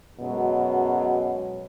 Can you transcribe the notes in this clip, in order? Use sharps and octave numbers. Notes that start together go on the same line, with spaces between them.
F#2 B2 F#3 G#3